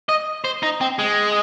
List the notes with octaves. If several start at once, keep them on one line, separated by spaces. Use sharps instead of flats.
D#5
C5
D#4
C4
G#3